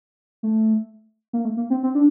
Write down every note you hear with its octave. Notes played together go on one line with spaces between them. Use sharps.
A3
A#3
A3
A#3
C4
C4
D4